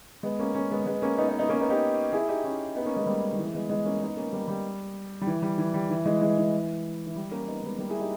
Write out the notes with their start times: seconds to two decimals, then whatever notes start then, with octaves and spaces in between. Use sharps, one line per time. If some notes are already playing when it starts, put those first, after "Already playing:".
0.23 G#3 B3
0.39 A#3 C#4
0.55 A#3 C#4
0.71 G#3 B3
0.86 G#3 B3
1.02 A#3 C#4
1.18 B3 D#4
1.28 B3 D#4
1.39 B3 D#4
1.49 A#3 C#4
1.60 B3 D#4
1.70 D#4 G4
2.13 E4 G#4
2.28 D#4 G4
2.44 C#4 E4
2.76 B3 D#4
2.86 A#3 C#4
2.96 G#3 B3
3.06 G3 A#3
3.33 G3
3.38 E3 G#3
3.53 G#3 B3
3.70 G#3 B3
3.85 A#3 C#4
4.01 B3 D#4
4.17 A#3 C#4
4.33 G3 A#3
4.48 G3
5.21 G3
5.27 E3
5.42 G3
5.58 E3
5.74 G3
5.90 E3
6.06 E3 G#3
6.21 E3 G#3
6.38 E3
7.07 E3
7.16 G3
7.31 A#3 C#4
7.48 B3 D#4
7.63 G#3 B3
7.78 G3 A#3
7.90 E4 G#4
8.00 D#4 G4